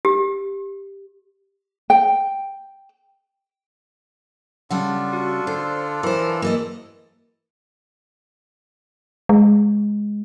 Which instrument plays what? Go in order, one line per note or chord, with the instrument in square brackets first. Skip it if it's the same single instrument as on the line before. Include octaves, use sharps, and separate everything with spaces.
[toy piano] G4
[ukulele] G5
[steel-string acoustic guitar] C#3 G3 F#5 [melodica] D4 F4 A4
[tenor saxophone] F#4
[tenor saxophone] D3 [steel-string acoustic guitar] C5
[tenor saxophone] E3 [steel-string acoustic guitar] A#4 C5
[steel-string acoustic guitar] A#3 A4 D#5
[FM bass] G#3